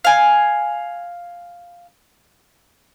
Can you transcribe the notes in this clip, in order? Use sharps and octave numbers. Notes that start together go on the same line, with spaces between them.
F5 G#5